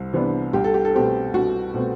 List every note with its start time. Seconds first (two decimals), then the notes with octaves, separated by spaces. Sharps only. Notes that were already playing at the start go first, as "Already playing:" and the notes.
Already playing: C2 C3
0.13 C3 E3 B3 D4
0.53 C2 G4
0.64 A4
0.74 G4
0.85 A4
0.94 B2 A3 C4 G4
1.33 C2 F#4
1.74 B2 A3 C4